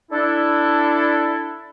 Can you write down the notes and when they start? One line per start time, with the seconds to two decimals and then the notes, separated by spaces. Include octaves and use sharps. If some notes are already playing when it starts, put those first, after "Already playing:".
0.11 D4 E4 A4